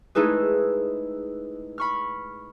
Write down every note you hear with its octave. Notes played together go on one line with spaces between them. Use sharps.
G#3 A3 D#4 E4 G#4 B4
B5 C#6 F6